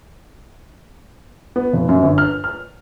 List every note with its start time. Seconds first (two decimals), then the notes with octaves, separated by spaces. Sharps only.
1.56 B3
1.73 F1
1.89 F#2
2.03 G1
2.18 F6
2.44 F6